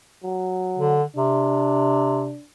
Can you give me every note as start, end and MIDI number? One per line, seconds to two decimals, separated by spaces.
0.24 0.99 54
0.78 1.03 50
1.16 2.36 48
1.16 2.44 62